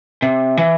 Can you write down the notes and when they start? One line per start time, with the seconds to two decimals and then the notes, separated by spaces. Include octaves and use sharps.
0.22 C3
0.57 E3